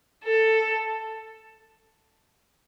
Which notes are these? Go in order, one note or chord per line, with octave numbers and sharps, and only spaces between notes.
A4